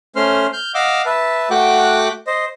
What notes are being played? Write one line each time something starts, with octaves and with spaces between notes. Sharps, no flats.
A3 C#4 C5 C6 F6
F6 G6
D#5 F5 F#5 D6 E6 F6
B4 E5 A5
A3 F#4 F#5 G5 D6 F#6
C5 D#5